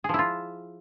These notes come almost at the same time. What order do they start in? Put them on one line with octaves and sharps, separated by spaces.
G#4 F3 E4 F4